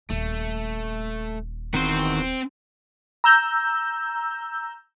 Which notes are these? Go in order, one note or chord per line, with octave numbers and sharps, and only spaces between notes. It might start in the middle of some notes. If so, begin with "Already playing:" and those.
D#1 A3
E2 D#3 C4 F#4 C5
A#5 E6 G6